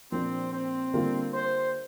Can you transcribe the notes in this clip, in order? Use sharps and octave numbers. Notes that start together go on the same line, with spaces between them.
A#2 F3 A#3 C4 D4
C4
D3 G3 A#3 F4
C5